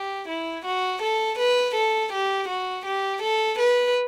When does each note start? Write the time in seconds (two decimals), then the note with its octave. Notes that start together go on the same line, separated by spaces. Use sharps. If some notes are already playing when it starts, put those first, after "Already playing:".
Already playing: G4
0.28 E4
0.65 F#4
1.02 A4
1.38 B4
1.75 A4
2.12 G4
2.48 F#4
2.86 G4
3.22 A4
3.59 B4